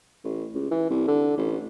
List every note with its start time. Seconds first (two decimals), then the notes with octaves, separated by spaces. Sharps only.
0.24 A1
0.55 C#2
0.71 E3
0.90 C2
1.08 D3
1.38 A1